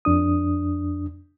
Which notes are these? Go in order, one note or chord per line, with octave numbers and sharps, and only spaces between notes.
F2 D4 D#6